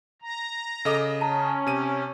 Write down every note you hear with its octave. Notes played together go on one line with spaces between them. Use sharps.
A#5
C#3 A4 D#5 D6
C#4 A5 A#5
C3 D#7